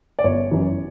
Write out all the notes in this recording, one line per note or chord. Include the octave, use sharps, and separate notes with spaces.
D5
G1 C#5
F#2 E3